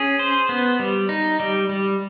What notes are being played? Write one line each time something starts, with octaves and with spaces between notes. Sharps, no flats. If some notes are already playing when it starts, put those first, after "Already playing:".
Already playing: C#4 G#4
C5
B3
G3
D#4
G3
G3